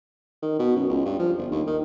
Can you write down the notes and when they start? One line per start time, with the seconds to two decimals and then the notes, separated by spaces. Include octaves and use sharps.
0.43 D#3
0.59 B2
0.76 F#2
0.89 C#2
1.06 G2
1.19 F3
1.38 G1
1.51 D#2
1.67 D#3